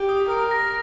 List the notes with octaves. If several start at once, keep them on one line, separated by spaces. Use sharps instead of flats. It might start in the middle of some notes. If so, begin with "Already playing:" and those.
Already playing: G4
D#6
A#4 D#6
A#6